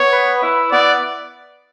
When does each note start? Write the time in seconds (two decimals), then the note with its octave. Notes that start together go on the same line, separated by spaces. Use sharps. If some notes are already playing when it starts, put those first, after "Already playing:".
Already playing: B3 C#5
0.12 B4
0.42 E4
0.71 B3 D5